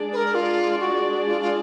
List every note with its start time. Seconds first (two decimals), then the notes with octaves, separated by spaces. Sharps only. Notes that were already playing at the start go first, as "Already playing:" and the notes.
Already playing: G#3 D4 G#4 D5
0.13 B4
0.16 A#4
0.35 F4
0.80 F#4
1.26 F4
1.41 F4